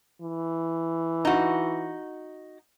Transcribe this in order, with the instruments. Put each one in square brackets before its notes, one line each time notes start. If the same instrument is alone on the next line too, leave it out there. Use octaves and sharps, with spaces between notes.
[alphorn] E3
[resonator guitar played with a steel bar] D#4 F#4